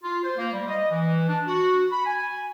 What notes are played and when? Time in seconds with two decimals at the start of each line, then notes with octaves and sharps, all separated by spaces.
0.03 F4
0.24 C5
0.37 A#3
0.53 G3
0.68 D#5
0.91 E3
1.28 D4
1.47 F#4
1.91 B5
2.06 G#5